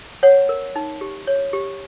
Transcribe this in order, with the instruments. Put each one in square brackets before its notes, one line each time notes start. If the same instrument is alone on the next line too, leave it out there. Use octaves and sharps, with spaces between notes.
[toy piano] C#5 F#5
A#4
D#4
G4
C#5
G4